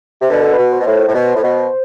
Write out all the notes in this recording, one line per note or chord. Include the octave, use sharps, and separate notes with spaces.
C3
B2 D3 B4
A4
B2 B4
C5
B2
A2
A2
B2
A2
B2